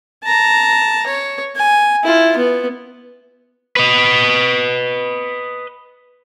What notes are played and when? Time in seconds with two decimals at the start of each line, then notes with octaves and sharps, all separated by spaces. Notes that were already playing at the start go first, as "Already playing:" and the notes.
0.24 A5 A#5
1.07 C#5
1.56 G#5
2.04 E4 F4
2.37 B3
3.76 B4 D#5